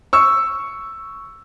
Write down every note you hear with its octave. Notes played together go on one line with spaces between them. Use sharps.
C#6 E6